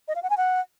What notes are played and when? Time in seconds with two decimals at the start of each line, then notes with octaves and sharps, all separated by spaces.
0.08 D#5
0.15 F5
0.23 F#5
0.30 G#5
0.37 F#5